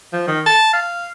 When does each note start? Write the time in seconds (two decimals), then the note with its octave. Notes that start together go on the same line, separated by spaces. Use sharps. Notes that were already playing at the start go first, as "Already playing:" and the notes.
0.13 F3
0.27 D#3
0.46 A5
0.73 F5